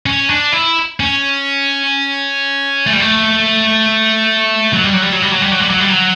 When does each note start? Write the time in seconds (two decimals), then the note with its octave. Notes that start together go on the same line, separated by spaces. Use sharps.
0.06 C#4
0.29 D4
0.52 E4
1.00 C#4
2.86 A3
2.93 G3
3.00 A3
4.73 F#3
4.84 G3
4.94 F#3
5.02 G3
5.12 F#3
5.22 G3
5.31 F#3
5.42 G3
5.51 F#3
5.60 G3
5.70 F#3
5.80 G3
5.89 F#3